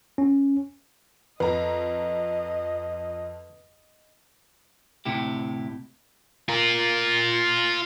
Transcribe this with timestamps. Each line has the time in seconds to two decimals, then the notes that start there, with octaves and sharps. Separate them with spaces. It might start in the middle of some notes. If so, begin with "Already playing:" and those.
0.18 C#4
1.40 F2 B4 D#5 A#5
5.05 D2 A2 C3 E4 G4
6.49 F4 A#4